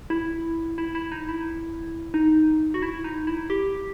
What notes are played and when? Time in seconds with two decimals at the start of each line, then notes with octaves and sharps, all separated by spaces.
0.10 E4
0.78 E4
0.95 E4
1.12 D#4
1.29 E4
2.14 D#4
2.74 F#4
2.82 E4
3.04 D#4
3.27 E4
3.50 G4